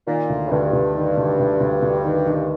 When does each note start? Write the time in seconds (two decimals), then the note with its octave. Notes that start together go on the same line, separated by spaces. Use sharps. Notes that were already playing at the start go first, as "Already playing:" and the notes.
0.07 A#2 D#3
0.29 D2
0.47 A2
0.51 D2 G2
0.73 D2
0.95 D#3
1.17 D2
1.39 D2
1.60 D2
1.82 D2
2.05 D#3
2.26 D#3